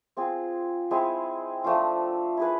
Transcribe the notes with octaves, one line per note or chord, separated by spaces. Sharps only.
C4 F4 G#4
G#3 C4 E4 G#4
F3 A3 D4 F4
E4 G#4 B4